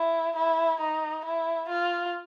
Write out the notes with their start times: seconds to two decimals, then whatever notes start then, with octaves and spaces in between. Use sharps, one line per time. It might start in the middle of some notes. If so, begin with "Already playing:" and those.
Already playing: E4
0.36 E4
0.80 D#4
1.25 E4
1.69 F4